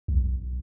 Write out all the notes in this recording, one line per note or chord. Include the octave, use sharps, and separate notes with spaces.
B1